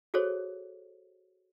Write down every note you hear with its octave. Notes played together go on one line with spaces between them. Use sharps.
F#4 G#4 A4 C5 C#5